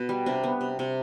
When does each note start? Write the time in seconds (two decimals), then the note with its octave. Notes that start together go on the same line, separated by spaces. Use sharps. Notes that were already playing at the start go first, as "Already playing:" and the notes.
Already playing: B2
0.09 G3
0.26 C3 D4
0.44 B3
0.61 C3
0.79 C3